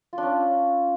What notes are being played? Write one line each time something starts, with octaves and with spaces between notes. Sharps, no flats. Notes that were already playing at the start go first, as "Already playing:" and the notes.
F4
D4
C#4